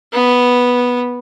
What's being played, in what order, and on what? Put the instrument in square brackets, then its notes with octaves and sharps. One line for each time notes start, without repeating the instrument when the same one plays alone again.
[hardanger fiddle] B3